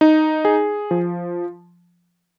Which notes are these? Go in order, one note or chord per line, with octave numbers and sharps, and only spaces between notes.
D#4
G#4
F3